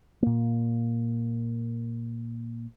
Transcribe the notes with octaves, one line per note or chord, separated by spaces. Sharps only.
A#2 A#3